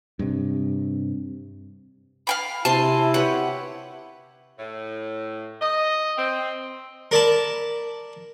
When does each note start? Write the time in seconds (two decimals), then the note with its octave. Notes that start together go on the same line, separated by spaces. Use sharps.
0.19 G2 C3
2.27 F5 G5 B5
2.65 C3 E4 G#5 A5 C6
3.14 G4 B4 C#5 F#5
4.59 A2
5.62 D#5
6.18 C4
7.11 A#4 D5 A5 B5